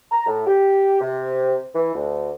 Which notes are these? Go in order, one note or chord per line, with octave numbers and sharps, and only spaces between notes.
A#5
A2
G4
C3
E3
D2